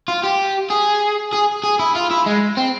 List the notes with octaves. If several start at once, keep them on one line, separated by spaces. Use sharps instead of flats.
F4
G4
G#4
G#4
G#4
E4
F4
E4
G#3
C4